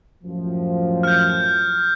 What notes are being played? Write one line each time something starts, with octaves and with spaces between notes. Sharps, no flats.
F#2 A2 F3
F6 G6